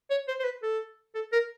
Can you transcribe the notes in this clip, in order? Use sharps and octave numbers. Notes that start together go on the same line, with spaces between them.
C#5
C5
C5
B4
A4
A4
A#4